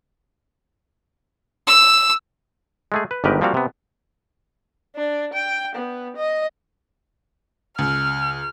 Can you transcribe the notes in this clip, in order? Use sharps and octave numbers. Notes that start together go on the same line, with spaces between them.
E6
G#3 A3 G#4
B4
G1 G#2 D#3 G4 A#4 B4
F3 G3 A#3 C4 F#4 F5
C3 B3
D4
G5
B3
D#5
C#2 F6